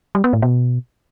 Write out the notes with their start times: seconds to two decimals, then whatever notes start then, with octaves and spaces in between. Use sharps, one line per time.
0.15 G3
0.24 B3
0.33 A2
0.42 B2